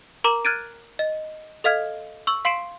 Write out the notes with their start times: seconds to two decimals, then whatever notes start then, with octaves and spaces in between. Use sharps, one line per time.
0.24 A#4 A#5 D6 E7
0.45 F6 F#6 G#6 A6 D7 D#7
0.99 D#5
1.64 A4 D#5 F5 F6 G#6
2.27 C#6 E6 F#7
2.45 F5 C6 C7 D7 E7